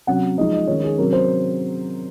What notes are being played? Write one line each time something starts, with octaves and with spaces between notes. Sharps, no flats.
C3 F#3 C#4 F#5
F3 G#3 D#4 D#5
D#5
D#3 G#3 C#4 C#5
G#4
C3 F#3 C#4 A#4
C5